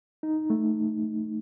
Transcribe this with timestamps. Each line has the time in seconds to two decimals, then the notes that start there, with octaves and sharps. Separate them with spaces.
0.23 D#4
0.50 A3